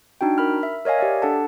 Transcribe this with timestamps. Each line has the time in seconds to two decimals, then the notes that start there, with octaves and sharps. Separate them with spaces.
0.21 D4 D#4 F#4 G5
0.38 A#4 B5 F6
0.63 E5
0.85 A#4 C#5 D#5 F5 G#5
0.99 G4 D5 E5
1.22 D4 A4 F#5 A5